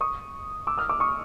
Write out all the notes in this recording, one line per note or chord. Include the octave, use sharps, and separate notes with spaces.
C#6 D#6
D6 E6
D#6 F6
D6 E6
C#6 D#6